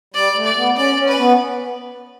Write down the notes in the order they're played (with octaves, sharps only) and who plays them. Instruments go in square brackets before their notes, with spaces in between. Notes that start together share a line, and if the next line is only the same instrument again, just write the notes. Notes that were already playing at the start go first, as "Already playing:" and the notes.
[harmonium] G3 [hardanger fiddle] D5
[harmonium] A3
[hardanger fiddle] D5
[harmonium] B3
[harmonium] C#4 [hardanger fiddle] D5
[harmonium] C#4
[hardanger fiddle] B4
[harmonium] B3